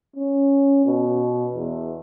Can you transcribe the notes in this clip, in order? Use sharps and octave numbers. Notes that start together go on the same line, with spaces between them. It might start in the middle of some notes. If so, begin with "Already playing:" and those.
C#4
B2
E2